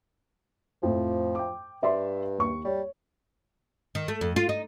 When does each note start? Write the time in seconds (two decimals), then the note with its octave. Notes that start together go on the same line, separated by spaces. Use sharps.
0.83 F2 A2 F3
1.35 G5 D6
1.83 G2 D5 E5 C6
2.39 D#2 C#6
2.65 G3 C#5
3.95 D#3
4.08 A3
4.21 F2
4.36 F4
4.49 D#4